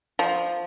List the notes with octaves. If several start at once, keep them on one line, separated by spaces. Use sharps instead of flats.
F3